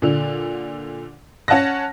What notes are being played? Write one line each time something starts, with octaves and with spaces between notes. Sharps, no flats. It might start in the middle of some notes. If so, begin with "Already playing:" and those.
A#2 D3
C#4 F#5 A5 F#6 A#6